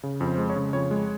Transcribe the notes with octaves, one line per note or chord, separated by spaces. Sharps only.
C#3
F2
C5
G#3
C#5
C#3
F2 C#5
G#3